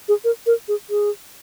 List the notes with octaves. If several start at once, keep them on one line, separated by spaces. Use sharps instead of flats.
G#4
A#4
A#4
G#4
G#4